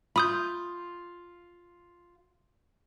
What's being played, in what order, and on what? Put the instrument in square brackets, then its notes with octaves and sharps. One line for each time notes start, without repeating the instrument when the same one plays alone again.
[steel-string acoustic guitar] F4 [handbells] B5 D#6 G6